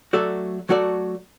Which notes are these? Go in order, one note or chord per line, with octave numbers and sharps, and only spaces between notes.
F#3 A3 F#4 A4 D5
F#3 A3 F#4 A4 D5